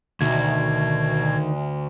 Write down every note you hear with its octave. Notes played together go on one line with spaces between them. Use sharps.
D2 B2 D#3 G#6